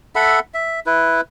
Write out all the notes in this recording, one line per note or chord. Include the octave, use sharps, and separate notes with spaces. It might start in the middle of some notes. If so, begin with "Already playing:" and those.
A4 E5 F#5 B5
E5
E4 B4